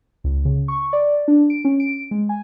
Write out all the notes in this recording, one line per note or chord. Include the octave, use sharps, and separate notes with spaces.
C#2
C#3
C#6
D5
D4
D7
C#4
D7
G#3
G#5